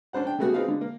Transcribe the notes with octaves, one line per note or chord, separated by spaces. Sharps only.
C#4 D4 C5 F#5
D4 G5
C#3 G3 A3 B3 F#4 G#4
C4 D#4 F4 G#4 B4 F5
D3
A#3